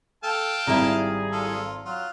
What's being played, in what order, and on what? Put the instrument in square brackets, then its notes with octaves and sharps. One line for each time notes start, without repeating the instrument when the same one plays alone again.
[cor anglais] A4 [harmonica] F5 G5 A5
[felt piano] G#1 A#5 [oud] G3 E4 [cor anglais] G#4
[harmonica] F4 A4
[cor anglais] F#3 [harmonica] F4